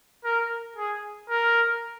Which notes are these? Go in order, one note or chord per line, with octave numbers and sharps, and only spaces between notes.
A#4
G#4
A#4